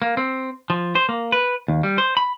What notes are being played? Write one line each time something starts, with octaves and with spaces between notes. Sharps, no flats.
A#3
C4
F3
C5
A#3
B4
D#2
G3
C5
B5